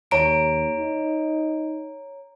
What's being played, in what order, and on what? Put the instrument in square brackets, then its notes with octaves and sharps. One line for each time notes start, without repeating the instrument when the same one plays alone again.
[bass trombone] D#2 [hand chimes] C#5 A#5 D7
[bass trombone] D#4